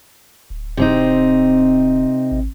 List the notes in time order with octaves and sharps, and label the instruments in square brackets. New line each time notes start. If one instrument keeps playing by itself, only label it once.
[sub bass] D1
[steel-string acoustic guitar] C3 C4 D#4
[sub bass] G#1